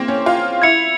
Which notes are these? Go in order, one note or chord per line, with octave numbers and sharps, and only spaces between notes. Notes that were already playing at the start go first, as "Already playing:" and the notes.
Already playing: A#3 C4
C#4
F4
E4 G#6 C#7 F7